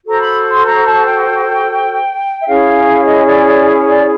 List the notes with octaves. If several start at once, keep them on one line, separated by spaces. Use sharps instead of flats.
F#4 A4 C5 A#5
B5
C6
A#5
A5
G5
E5
C#4 E4 G#4 C#5 F5
D#5
D5
D5
C#5
D5